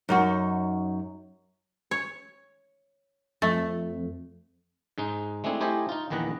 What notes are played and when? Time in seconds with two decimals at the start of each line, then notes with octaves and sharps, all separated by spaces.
0.09 F#2 D#4 F#4
1.91 C#5
3.42 F2 A3
4.98 G#2 G#3 D#4
5.44 G#3 A3 C4 D4 E4 G#4
5.60 A3 E4 G4 C5 D#5 G#5
5.89 D#4 F4
6.10 A#1 E2 D#3 B4 D#5 F#5